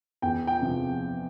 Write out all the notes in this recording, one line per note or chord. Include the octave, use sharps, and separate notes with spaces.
E2 G5
G5
C3 F3